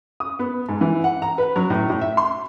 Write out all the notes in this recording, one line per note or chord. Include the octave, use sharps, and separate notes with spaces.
D#6
B3
G#2
E3
F#5
A#5
B4
F#3
A2
A2
E5
C6